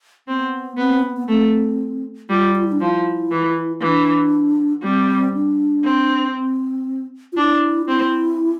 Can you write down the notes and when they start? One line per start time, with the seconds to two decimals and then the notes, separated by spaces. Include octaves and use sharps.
0.28 B3 C4
0.77 B3 C4
1.03 B3
1.17 B3
1.29 A3 C4
2.30 G3 F4
2.55 F4
2.64 E4
2.72 D4
2.80 F3 E4
3.31 E3
3.81 E3 D4
4.83 G3 C4
5.34 D4
5.84 C4
6.36 C4
7.32 F4
7.37 D4 E4
7.87 C4 E4